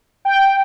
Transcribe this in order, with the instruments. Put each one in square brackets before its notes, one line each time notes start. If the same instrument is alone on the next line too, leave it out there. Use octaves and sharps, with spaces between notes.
[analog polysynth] G5